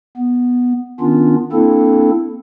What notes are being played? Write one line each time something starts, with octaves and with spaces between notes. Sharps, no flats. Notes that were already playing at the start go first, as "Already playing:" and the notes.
B3
D#3 B3 C#4 D4 F4
A#3 C4 D4 E4 A4